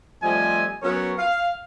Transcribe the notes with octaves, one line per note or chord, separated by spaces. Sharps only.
F3 G3 A3 C4 D#5 G#5
F#3 B3 C#4 A#4 C#5
F5